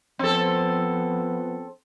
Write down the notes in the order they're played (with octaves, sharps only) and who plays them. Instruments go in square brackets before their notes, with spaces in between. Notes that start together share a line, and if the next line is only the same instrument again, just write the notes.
[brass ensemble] F3 B3 [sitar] C4 A4